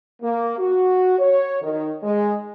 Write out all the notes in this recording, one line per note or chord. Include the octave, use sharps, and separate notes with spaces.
A#3
F#4
C#5
D#3
G#3